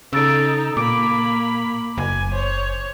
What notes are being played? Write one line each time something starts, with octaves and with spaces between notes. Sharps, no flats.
C#3 D#4 A4 E6 A6 D7
A#2 A#3 B5 D6 D7
F#1 G#5
C5 C#5